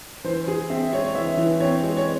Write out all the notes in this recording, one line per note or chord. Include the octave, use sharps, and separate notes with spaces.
E3 C5
E3 G#4
C4 E5
G#3 C#5
C#5
E3 E5
E3
C4 C#5
G#3
C#5